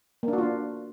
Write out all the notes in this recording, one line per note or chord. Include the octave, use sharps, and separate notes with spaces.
A#3
D4
F#4
F4
D4